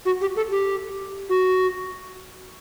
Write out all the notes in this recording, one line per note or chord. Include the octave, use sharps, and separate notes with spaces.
F#4
G4
A4
G4
F#4